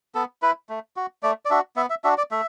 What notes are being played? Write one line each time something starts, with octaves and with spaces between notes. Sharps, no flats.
B3 A4
E4 B4
A3
F#4
A3 D5
D5
D4 F#4 E5
B3 E5
E5
D4 F#4 E5
D5
A3 E5